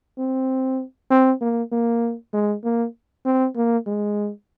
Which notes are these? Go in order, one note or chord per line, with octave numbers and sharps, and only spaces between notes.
C4
C4
A#3
A#3
G#3
A#3
C4
A#3
G#3